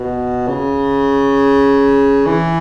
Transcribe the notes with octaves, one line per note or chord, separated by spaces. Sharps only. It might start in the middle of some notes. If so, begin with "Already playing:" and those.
Already playing: B2
C#3
E3